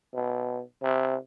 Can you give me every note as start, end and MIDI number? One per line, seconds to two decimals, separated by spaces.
0.14 0.61 47
0.83 1.16 48